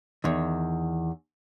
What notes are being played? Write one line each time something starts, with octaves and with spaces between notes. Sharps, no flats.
E2 D#3